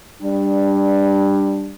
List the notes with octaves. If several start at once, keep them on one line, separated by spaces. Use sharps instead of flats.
G3 D4